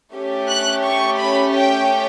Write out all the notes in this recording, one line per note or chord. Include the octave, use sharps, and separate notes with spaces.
A3 C#4 G4
F#6
C#6
B5
G5